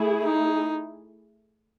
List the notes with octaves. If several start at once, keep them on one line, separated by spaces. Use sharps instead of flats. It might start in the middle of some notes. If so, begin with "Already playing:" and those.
Already playing: A3 E4 G#4
D#4